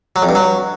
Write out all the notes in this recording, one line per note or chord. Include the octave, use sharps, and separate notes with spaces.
F#3
F2
G2
F#3